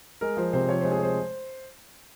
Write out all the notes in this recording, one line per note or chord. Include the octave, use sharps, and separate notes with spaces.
G#3 A#4
F3 C5
C3 C5
F3 C#5
G#3 C5
G#4
G#3 C5